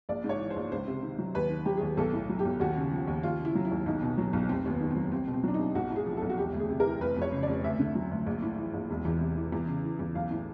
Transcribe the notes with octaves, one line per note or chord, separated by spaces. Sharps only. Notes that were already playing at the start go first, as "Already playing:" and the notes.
A#1 D5
G#2
C#5
E3
C5
A#1
C#2 C5
C3
D#3
F#3
D#2 B4
D#3
F#3 G4
D#2 G#4
B1 A4
A2
F#3
G4
B1
D#2 F#4
C#3
F3
D#2
D#2 F4
C#3
E4
F#3
E4
D#2
B1 D#4
B2
F#3
B1
F1 C4
D#2 B3
D#3
C4
F#3
C2 C4
B2
C4
F#3 D4
C2 D#4
B1 F#4
A2
G#4
F3
B1 A4
F#4
E1 G4
D2
G#4
C3
E3 A#4
F1 B4
F2 C#5
C#3
F1 D5
D2 E5
D3
F#3
D2
A#1
A2
E3
A#1
E1
E2
C3
E3
E2
C#3
E3
E2
B1 F5
A2